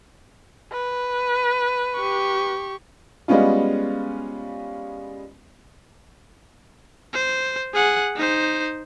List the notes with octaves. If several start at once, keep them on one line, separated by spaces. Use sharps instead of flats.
B4
G4 C#6
G3 G#3 B3 C#4 F4
C5
G#4 F#5
D#4 C5